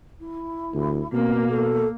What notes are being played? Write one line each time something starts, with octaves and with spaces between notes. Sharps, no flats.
E4
D2
B2 A#3 C4
A4